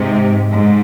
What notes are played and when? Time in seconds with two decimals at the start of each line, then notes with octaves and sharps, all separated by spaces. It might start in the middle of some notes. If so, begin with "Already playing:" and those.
Already playing: G#2 C3
0.53 G#2